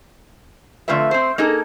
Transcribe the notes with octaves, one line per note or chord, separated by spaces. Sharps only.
F2 D3 A3 F4 B4 E5
C4 C5
A#3 D#4 G#4 A4